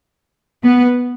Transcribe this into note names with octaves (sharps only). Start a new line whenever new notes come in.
B3